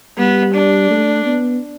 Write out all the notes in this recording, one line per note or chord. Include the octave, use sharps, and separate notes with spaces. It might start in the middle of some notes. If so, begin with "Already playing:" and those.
G3 B3
D4
A3
B3